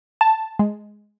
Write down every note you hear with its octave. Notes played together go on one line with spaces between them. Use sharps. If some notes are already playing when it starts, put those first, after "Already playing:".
A5
G#3